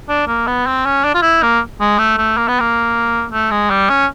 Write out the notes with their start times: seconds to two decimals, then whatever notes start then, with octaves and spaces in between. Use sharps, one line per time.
0.09 D4
0.28 A#3
0.47 B3
0.66 C4
0.86 C#4
1.04 D4
1.14 F4
1.22 E4
1.43 A#3
1.81 G#3
1.98 A3
2.18 A3
2.37 A#3
2.48 B3
2.60 A#3
3.31 A3
3.51 G#3
3.70 G3
3.89 C#4